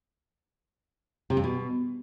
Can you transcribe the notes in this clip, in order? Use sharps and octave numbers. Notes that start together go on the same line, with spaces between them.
C3
G2
B2